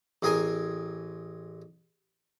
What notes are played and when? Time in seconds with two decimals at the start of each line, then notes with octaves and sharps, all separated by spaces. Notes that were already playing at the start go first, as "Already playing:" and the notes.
0.22 A1 C4 G#4 A#4 G#5 C6